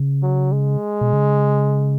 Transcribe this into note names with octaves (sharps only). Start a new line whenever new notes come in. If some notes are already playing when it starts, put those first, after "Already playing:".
Already playing: C#3
F#3
G#3
B2
C#3